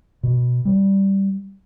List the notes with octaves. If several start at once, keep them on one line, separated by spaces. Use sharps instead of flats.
B2
G3